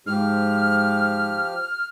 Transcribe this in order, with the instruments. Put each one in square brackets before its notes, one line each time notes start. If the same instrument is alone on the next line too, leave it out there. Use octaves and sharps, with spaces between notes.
[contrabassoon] G#2 [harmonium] F3 G4 [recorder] F6